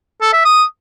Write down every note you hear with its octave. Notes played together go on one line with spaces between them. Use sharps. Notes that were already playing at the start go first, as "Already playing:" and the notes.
A4
E5
D#6